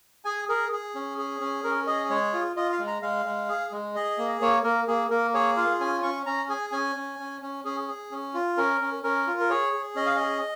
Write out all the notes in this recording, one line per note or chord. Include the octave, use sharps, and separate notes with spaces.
G#4 G#5
G#4 A#4
G#4
C#4
G#4
C#4
C#4 A#4
G#4 D#5
G#3 C#5
F4
F4 D#5
F5
G#3
A#5
G#3 F5
G#3
G#4
G#3
G#4 D#5
A#3
A#3 C#5
A#3 A#4
A#3 G#4
A#3 A#4
G#4 C#5
F4 F5
C#4 G#5
C#4 C#6
C#4 A#5
G#4 G#5
C#4 G#5
C#4
C#4
C#4
C#4 G#4
G#4
C#4
F4
C#4 A#4
C#4
C#4 A#4
F4
A#4
G#4 C#5
G#4
C#4 D#5
F5
G#4 D#5